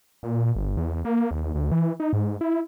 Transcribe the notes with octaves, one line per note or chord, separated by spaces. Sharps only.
A#2
G1
E2
A#3
D#2
D2
E3
D#4
G#2
E4